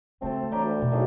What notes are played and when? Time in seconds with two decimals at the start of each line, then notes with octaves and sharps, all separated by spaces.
0.22 C#3 G#3 A3 C4 A4
0.52 E3 D4 C#5 D5 G5 A#5 B5
0.63 D2
0.80 E2 B2
0.92 G#2 D#3 F#3 D4 E4 A4